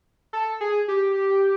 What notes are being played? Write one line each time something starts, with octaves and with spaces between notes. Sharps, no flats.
A4
G#4
G4